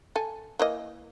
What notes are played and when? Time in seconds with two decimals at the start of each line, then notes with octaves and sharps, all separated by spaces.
0.16 A4 G#5
0.59 E3 A#3 D#5